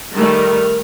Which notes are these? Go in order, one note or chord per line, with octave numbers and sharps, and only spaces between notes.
D#3 G3 A3 A#4